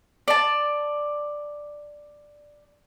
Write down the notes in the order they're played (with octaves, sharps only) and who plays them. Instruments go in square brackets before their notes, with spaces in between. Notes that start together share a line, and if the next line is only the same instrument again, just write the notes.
[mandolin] D5 A5